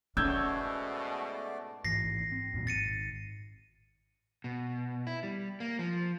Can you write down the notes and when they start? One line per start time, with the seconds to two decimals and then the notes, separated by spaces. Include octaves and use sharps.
0.17 G#2 B2 A3 C#4 D5 E6 G6 G#6
1.85 A1 G#2 E3 A#6 C7
2.32 C4
2.53 E2 A#2 F#3
2.67 D#1 G#1 A6 C#7 D#7
4.44 B2
5.07 E4
5.23 G3
5.60 A#3
5.79 F3